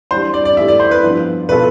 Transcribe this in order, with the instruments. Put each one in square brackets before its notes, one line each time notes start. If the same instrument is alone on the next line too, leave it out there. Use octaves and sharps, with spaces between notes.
[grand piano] E3 G3 D4 [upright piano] C5
[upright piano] D5
D5
[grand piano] E3 A3 E4 G4 [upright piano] E5
[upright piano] D5
C5
B4
[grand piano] G2 F3 B3 F4
[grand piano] B2 B3 F4 A4 [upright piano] B4